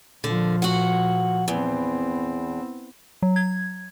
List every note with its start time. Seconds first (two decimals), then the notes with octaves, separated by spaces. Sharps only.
0.24 A#2 D3 F3
0.62 F#4 F#5
1.48 E2 B3 C4
3.23 F#3
3.36 G#6